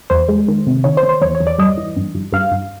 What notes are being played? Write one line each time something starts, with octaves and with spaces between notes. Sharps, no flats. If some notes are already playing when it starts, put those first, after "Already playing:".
E2 C5
G#3
D#3
C3
D#3 C#5
C5
D#3
C5
E2 C#5
C#5
E2
D5
G2 D#5
E3
G2
G2
G2 F5
G2